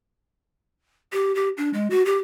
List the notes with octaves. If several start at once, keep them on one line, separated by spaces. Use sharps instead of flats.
G4
G4
D4
G#3
F#4
G4